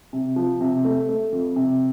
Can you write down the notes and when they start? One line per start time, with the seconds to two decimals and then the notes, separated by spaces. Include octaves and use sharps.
0.13 C3
0.36 F3
0.61 C3
0.85 A3
1.09 A3
1.32 F2
1.56 C3